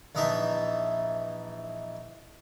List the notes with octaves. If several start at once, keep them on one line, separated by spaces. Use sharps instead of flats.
A#1 E3 D#4 D#5 E5 A5